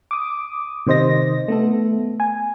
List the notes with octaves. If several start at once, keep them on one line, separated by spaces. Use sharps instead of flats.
D6 D#6
C3 D#3 C5 D#5 A#6
A3 B3 A4
G#5